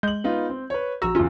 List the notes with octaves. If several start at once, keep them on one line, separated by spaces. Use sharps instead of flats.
G#3 G6 F#7
B3 D#4 F4
C4
B4 C#5
A#1 F#4 A#5 E6
E2 C#3 C#4 F4